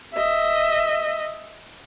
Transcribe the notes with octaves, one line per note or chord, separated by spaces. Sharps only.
D#5 E5